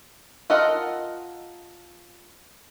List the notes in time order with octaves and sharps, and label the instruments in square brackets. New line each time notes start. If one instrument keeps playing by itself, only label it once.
[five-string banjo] F4 A4 A#4 D#5 F#5